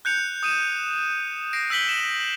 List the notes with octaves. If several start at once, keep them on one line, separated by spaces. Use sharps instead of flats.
F#6 G6 C#7 F7
D#6 D#7 E7
A#6 C7 D7
E6 G6 B6 F#7 G7
E7